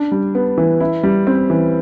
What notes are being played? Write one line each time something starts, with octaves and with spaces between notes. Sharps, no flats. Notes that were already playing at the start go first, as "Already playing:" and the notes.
Already playing: D4
G3
B3
E3
E4
G3
C4
E3